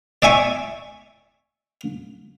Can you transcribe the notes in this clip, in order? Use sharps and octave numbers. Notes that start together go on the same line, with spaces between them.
D5 E5 G#5 C#6